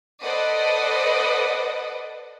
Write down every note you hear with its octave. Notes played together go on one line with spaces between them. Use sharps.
A4 B4 C5 D5 D#5 F#5